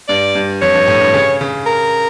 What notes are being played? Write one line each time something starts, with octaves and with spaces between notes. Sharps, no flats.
G2 D5
G2
F2 C#5
G2
A2
G2
C#3
C#3
A#4